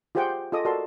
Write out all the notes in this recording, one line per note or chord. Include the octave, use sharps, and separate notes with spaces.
F4 G4 G#4 C5 F#5 G5
F4 G#4 A4 D#5 D6 D#6
F#4 A4 A#4 D5 A5 C6